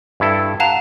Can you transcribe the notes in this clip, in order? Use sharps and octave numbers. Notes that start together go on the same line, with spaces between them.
G2 E4 A4
F5 F#5 A5 A#5